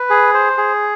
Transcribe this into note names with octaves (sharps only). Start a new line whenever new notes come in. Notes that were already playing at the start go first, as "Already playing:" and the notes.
Already playing: B4
G#4
C5
G#4